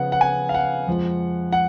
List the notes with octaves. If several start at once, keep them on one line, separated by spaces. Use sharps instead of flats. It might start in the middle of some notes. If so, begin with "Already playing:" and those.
Already playing: C#3 F3 B3 F#5
F#5
G#5
F5
F#5
F2 F3 G#3
F#5